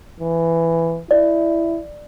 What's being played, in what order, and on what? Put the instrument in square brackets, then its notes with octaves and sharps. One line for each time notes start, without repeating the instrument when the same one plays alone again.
[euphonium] E3
[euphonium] E4 [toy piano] D5